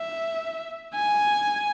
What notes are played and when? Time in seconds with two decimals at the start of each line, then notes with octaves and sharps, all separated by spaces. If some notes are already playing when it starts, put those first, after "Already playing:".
Already playing: E5
0.94 G#5